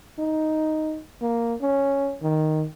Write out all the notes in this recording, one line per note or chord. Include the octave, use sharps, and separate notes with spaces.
D#4
A#3
C#4
D#3